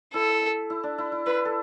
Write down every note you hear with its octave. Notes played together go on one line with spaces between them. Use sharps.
E4 A4
E4
D4
E4
E4
E4 B4
A4